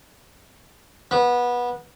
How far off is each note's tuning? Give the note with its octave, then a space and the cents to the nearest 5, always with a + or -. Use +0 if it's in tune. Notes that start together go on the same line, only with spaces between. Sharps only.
B3 -20